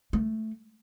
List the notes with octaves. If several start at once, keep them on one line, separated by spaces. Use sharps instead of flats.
A3